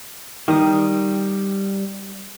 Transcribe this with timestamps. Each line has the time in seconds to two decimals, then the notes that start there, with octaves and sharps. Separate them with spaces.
0.48 D#3 G3 D#6